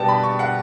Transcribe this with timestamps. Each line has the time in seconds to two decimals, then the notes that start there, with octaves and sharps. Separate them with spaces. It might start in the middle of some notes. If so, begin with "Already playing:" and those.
Already playing: B2 G3 B3 G5 A5
0.09 B5
0.23 C#6
0.39 F#5